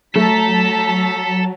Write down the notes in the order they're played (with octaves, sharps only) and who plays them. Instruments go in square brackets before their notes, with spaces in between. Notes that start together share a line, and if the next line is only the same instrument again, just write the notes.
[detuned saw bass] F#3 [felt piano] A3 [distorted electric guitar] A4 [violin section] A5 A#5 B6